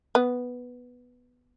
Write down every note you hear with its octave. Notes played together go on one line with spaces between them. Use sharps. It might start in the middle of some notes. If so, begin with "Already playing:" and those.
B3